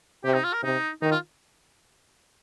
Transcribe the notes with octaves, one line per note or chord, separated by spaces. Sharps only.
C3 G4
D#4
F4
A#4
C3 D#4
D#3 D#4
F4